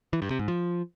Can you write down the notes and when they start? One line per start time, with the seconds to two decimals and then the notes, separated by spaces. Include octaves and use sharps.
0.13 E3
0.22 G2
0.31 C3
0.39 G#2
0.48 F3